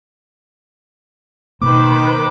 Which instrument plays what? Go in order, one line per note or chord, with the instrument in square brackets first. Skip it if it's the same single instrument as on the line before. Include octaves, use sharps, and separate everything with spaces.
[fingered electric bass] B2 A#3 [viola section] D#3 B4 C5 [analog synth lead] D6